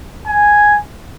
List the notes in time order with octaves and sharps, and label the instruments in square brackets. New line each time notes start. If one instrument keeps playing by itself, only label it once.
[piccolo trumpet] G#5